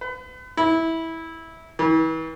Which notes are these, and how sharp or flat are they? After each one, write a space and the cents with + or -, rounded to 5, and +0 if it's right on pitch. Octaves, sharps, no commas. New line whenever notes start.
B4 +40
E4 -15
E3 -40